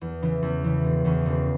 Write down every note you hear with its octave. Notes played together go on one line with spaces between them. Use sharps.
E2
C#3 E3
E2
C#3 E3
E1
E2 C#3 E3 C#4
E1